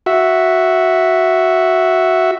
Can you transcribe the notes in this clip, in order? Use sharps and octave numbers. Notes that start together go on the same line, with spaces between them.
F#4 E5